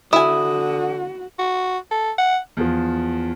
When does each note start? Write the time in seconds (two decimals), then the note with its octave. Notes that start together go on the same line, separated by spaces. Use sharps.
0.13 D3 E4 F#4 G#5 D#6
1.39 F#4
1.91 A4
2.18 F#5
2.57 E2 F3